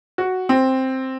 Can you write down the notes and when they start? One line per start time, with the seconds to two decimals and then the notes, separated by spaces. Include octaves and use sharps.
0.18 F#4
0.49 C4